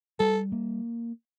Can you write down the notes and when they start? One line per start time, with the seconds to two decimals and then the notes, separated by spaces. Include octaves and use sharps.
0.19 G3 A4
0.52 A#3